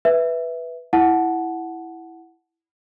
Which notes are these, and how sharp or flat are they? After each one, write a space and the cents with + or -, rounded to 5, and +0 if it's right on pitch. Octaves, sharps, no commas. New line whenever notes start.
B4 +0 E5 +0
E4 +0 F#5 +0 A5 -25